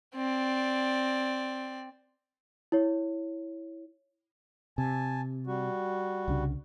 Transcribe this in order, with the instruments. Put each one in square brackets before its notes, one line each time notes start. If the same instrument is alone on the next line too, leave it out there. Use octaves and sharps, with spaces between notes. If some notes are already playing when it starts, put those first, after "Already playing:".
[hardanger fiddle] C4 D5
[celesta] E4 C#5
[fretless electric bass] C3 [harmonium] G#5 A5
[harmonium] G3 F#4
[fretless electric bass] C2 C#3 D4